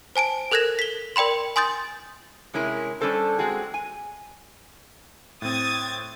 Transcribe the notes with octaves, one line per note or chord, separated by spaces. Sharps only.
C5 G#5 A5 D7
A4 A#4 F#6 G#6 A#6 E7
B6 G7
A#4 D5 G5 B5 C6
G#5 C6 D#6 G6 A6
C3 G#3 C#4 E4 A#4
G3 C#4 D4 A4 C5
G#3 C4 F#4 G#4
G#5
A2 C4 D#6 G#6 A6